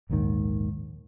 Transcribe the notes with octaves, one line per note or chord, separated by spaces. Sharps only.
A#1 D#2 G#2 D#3